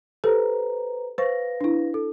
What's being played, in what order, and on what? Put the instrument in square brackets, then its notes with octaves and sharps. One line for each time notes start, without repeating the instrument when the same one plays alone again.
[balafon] G4 A4 [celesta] B4 C5 A#5
[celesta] B4 F5 A#6 [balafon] C5 C#6
[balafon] D4 E4
[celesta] A4